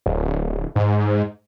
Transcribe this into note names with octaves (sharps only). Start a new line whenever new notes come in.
D1
G#2